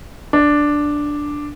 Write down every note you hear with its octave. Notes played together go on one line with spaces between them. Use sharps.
D4